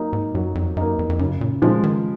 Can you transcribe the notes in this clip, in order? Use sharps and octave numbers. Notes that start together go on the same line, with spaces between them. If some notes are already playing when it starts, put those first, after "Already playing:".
Already playing: F#3 A#3 D#4
G#2
F#2 F#3
F2
F#2 A#3 D#4
F2
F2
F#2 C#3
A#2
A#2 F3 G#3
D#3